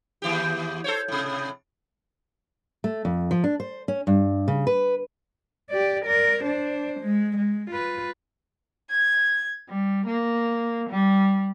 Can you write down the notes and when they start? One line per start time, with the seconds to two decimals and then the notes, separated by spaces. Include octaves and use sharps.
0.22 D#2 E3 G4
0.84 A4 C5 C#5
1.08 A2 C3
2.84 A3
3.05 F2
3.31 F3
3.44 D4
3.60 C5
3.88 C#4
4.07 G2
4.48 C#3
4.67 B4
5.70 G4 D5
6.06 A#4 D5
6.42 D4 C5
7.01 G#3
7.37 G#3
7.71 F4 B4
8.92 G#6
9.69 G3
10.07 A#3
10.89 G3